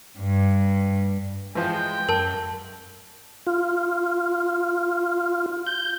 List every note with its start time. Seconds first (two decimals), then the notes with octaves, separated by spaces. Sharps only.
0.19 G2
1.55 E3 F3 G#3 G5
2.09 F#2 A#4 A5
3.47 F4
5.67 G6